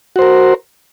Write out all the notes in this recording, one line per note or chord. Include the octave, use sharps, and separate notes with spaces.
F#4 A#4 C5